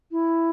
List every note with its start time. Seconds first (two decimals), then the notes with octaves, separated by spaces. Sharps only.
0.12 E4